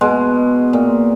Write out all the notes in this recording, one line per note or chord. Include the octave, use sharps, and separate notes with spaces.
B2 G#3
A#2